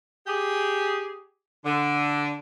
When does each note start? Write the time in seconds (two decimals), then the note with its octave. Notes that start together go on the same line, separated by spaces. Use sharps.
0.26 G4 G#4
1.65 D3